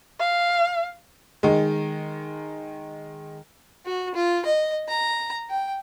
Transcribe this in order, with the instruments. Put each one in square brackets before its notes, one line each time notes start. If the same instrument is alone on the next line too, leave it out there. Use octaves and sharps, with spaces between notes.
[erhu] F5
[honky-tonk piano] D#3 G#3
[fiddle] F#4
F4
D#5
A#5
G5